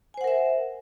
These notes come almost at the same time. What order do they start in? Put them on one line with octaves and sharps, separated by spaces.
G#5 C5 F#5 A#4 E5